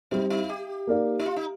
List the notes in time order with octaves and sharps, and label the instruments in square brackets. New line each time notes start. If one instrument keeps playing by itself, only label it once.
[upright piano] G3 C4 G4 C5 [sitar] D#4
[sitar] D#4
G4
[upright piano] A#3 D#4 A#4 D5 F5
[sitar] D#4
F4
D#4